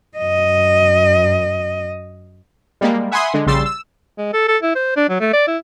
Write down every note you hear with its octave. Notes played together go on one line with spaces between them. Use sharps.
F#2 D#5
G3 G#3 A#3
E5 F#5 G#5 B5 C6 D#6
D3 G#3
A#1 C#3 G3 C6 E6 A6
E6
G#3
A4
A4
E4
C5
D4
F#3
A3
D5
E4